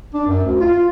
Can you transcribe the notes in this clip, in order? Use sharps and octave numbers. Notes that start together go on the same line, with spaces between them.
D4
F#2
D2
F4